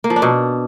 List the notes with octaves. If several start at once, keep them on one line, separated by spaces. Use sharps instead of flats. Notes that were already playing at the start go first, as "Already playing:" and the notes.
A#3
F3
D4
B2